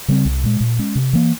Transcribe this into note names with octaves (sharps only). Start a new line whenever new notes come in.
C#3 G3 C4
C2
A#2 G#3
A#2
G#3 C#4
C3
E3 A#3